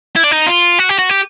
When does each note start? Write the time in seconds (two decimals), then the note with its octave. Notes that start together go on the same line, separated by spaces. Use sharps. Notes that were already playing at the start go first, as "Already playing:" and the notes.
0.16 E4
0.24 D4
0.32 D#4
0.47 F4
0.79 F#4
0.89 G4
0.99 F#4
1.09 G4